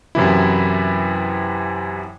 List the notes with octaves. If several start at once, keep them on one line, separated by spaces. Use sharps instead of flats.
F#2 C3 E3 E4